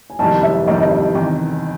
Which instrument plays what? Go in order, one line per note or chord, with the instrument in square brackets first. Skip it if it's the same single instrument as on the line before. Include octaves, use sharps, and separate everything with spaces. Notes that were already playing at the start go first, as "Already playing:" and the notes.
[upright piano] G#5
[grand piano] F#1 F2 C3 D#3 G3 [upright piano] A5
[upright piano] E5
[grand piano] F#1 F2 C3 D#3 G3 [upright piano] D#5
[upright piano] D#5
E5
[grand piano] E2 C3 D#3